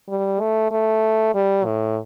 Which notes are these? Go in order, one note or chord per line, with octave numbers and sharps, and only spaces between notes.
G3
A3
A3
G3
A2